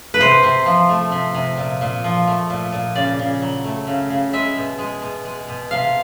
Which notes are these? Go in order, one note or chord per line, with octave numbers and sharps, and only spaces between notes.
B4
C3 C5
C3
F3
A3
C3
C3
A#2
A#2
F3
A3
A#2
A#2
C#3 D5
C#3
F#3
A3
C#3
C#3
G#3 E5
B2
G#3
B2
G#3
B2
C3 F5